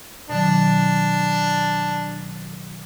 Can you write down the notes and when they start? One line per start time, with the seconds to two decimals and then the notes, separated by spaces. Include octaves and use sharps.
0.30 B2 D#3 F#3 D4